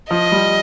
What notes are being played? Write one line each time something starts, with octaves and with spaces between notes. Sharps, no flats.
F3 D#5
G3